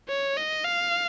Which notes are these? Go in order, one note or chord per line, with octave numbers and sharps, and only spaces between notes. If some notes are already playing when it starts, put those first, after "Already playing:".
C#5
D#5
F5